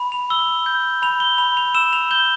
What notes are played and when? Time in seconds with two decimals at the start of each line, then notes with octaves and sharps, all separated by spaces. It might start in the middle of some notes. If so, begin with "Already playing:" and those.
Already playing: B5
0.12 F7
0.30 E6 G7
0.66 G6
1.02 B5 F7
1.20 G7
1.38 B5 F7
1.57 F7
1.74 E6 E7
1.93 F7
2.11 G6 G7